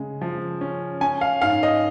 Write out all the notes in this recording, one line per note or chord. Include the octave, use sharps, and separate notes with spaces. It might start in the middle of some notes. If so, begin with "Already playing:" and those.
Already playing: C#3 G#3
F3
C#4
C#4 G#5
F5
G#2 F5
D#5